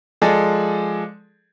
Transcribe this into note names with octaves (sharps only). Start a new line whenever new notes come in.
F3 G#3 G#4 A4 D5